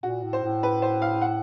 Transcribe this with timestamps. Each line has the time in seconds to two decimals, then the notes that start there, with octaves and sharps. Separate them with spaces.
0.03 A#2 F#4
0.23 A2
0.33 C5
0.43 A2
0.63 B4
0.82 C5
1.02 F5
1.21 F#5